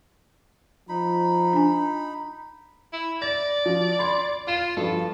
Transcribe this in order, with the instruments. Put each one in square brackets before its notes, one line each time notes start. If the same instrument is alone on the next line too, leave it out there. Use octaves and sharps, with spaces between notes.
[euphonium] F3 [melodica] D#4 B5
[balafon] D4 G#5
[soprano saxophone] E4
[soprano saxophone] D5 [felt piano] A#6
[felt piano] F3
B5 C6 G#6
[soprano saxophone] F4 [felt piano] F5 E7
[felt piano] G2 F3 B3 [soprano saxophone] A4